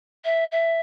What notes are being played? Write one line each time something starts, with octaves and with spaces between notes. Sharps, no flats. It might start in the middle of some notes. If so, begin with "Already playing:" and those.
E5
E5